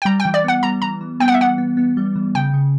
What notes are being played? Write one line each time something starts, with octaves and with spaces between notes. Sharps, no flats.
G5
G3 A#5
G5
E3
D5
B3 F#5
G3 A#5
E3 A#5
E3
B3 G5
F#5
E5
E3 F#5
B3
B3
G3
E3
C#3 G5
C#3